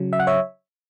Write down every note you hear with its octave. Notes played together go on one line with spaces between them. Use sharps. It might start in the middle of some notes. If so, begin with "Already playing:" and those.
Already playing: C#3 F#3
E5
F#5
C#5 E5